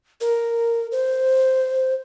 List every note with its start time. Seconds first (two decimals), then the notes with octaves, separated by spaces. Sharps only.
0.21 A#4
0.92 C5